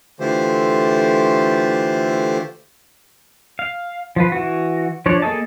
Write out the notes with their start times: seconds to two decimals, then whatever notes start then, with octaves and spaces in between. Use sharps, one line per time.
0.20 D3 E3 A3 F4 G4 C5
3.59 F5
4.16 F3 F4 B4
4.32 E3 F#4
5.06 F3 D4 C#5 D5
5.22 A#3 G#4 A4 D#5 A5